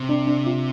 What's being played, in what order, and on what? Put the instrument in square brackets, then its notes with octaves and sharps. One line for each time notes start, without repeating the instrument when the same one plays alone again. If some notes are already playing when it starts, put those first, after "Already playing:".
Already playing: [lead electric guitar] C3
[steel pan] D4
D4
F4